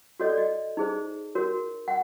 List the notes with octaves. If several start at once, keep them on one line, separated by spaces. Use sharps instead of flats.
F#4 A4 C#5 D#5
D5
D#5
D#4 G#4 C5
F#4 A#4 C#5
F#5